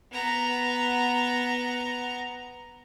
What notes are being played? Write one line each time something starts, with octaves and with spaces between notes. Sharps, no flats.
B3 A#5